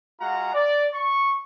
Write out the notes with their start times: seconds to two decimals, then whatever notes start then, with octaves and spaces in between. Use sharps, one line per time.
0.20 G#3 F4 F#4 F#5 A#5
0.54 D5
0.94 C#6